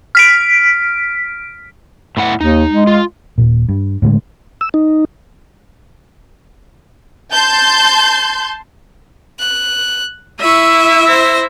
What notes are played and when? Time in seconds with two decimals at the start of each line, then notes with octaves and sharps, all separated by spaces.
0.15 F6 B6 D7
2.17 A2 E4 F#5
2.41 D#2 D#4
2.70 G#3
2.87 F4
3.38 D#1 A#2
3.69 G2
4.02 A2 D3 F#3 G#3
4.61 E6
4.74 D#4
7.32 A5 C6 G6
9.39 F#6
10.40 E4 E5 C#6 D#7
11.07 C5 A#6